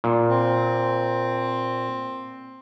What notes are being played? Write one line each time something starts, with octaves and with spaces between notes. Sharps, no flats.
A#2
C4